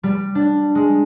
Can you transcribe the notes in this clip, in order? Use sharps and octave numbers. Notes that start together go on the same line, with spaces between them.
G3
D4
G#3